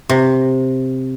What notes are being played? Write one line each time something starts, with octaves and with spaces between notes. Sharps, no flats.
C3